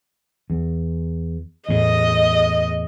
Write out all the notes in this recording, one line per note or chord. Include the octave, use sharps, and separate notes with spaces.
E2
E2 A2 D#5